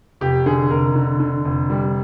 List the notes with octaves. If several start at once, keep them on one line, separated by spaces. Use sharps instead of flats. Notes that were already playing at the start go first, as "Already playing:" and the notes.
F1 G4
D3 G#4
F1 A#4
D3
D3
F1
G3